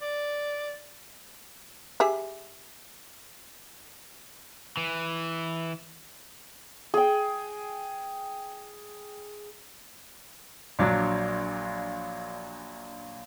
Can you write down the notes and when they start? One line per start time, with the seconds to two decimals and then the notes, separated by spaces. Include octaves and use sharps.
0.02 D5
2.00 G4 G#4 E5
4.77 E3
6.94 G#4 G5
10.79 A#1 A#2 F#3 D4 D6